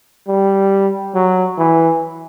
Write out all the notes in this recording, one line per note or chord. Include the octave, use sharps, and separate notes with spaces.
G3
F#3
E3